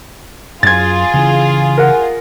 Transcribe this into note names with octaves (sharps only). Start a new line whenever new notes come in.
F#2 F4 G#4 G#6 A6
C#3 E3
A#4 F#5